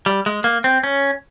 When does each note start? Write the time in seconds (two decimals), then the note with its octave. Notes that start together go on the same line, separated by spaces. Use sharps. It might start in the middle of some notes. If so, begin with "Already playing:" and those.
0.06 G3
0.26 G#3
0.44 A#3
0.64 C4
0.83 C#4